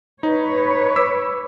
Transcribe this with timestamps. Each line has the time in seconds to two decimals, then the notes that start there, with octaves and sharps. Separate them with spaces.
0.23 D#4 B4 C#5
0.96 D6 E6 B6